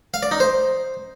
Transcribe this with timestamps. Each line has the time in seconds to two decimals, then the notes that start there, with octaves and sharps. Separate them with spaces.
0.14 F5
0.23 D5
0.31 D#4
0.40 C5